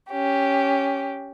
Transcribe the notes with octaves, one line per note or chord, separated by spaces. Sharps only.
C#4 G4